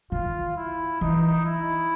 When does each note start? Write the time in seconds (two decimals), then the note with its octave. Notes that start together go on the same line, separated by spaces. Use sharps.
0.12 D#3 F4
0.56 E4
1.01 E3 D#4
1.45 E4